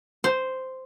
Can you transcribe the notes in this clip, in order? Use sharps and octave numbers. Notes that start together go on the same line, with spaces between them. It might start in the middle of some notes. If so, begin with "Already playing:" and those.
C5